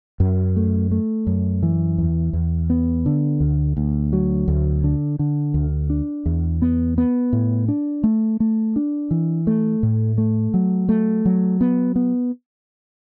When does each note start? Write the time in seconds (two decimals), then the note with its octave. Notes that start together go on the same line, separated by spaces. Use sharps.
0.20 F#2
0.56 A3
0.91 A3
1.27 F#2
1.63 E3
1.98 E2
2.33 E2
2.70 B3
3.06 D3
3.40 D2
3.77 D2
4.13 F#3
4.48 D2
4.84 D3
5.19 D3
5.54 D2
5.90 D4
6.26 E2
6.62 B3
6.98 B3
7.33 A2
7.68 D4
8.04 A3
8.40 A3
8.76 D4
9.11 E3
9.47 A3
9.83 A2
10.18 A3
10.54 F#3
10.89 A3
11.26 F#3
11.61 B3
11.96 B3